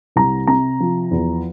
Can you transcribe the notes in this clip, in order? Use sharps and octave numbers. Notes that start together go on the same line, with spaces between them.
C2 A#5
C3 A#5
F3
E2